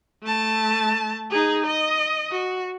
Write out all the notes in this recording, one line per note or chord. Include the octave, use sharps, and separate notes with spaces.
A3 A5
D#4 G#4
D#5
F#4